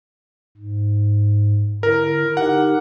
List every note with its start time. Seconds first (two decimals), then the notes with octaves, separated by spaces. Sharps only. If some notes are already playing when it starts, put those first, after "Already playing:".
0.58 G#2
1.83 D3 E4 A#4
2.37 D#4 G4 A#4 F#5